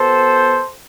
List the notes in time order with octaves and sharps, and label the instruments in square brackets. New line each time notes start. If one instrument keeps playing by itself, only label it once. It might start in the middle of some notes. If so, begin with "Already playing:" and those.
Already playing: [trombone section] B2 B3 A4 C5